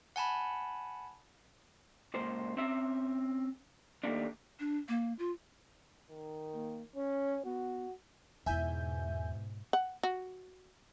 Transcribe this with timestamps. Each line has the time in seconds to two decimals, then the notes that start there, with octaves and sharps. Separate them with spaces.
0.16 F#5 G#5 A5 B5
2.14 C#2 A#2 C5
2.57 C4 C#4 E5
4.03 D#3 F#3 G3 A3 A#3 D4
4.60 D4
4.89 A#3
5.19 F4
6.10 D#3
6.53 A#3
6.95 C#4 C#5
7.45 B3 F#4
8.46 E2 G#2 B2 E4 E5 G#5 G6
9.73 F#5
10.03 F#4